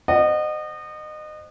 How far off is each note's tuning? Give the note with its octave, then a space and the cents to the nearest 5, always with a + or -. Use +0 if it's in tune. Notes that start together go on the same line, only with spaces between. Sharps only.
C5 +0 D#5 -30 F#5 +0